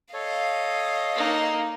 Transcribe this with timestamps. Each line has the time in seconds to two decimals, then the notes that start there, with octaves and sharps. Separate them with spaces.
0.14 A4 C#5 D#5 F5
1.16 A#3 D#4